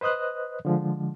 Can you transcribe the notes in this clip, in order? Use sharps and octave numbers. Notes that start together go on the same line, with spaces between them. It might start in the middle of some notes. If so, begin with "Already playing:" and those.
B4 C5 D#5 D#6 F#6
D3 F3 G#3